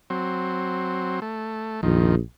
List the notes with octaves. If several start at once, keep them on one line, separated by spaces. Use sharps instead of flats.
F#3 C4
A3
A#1 F2 D#3